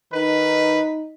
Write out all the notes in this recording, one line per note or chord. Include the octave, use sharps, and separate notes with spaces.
D#3 D#4 B4